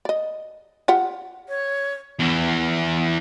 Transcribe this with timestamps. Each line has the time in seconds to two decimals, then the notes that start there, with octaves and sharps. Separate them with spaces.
0.05 D5 D#5
0.88 F4 G4 F#5
1.49 C#5
2.19 E2 E3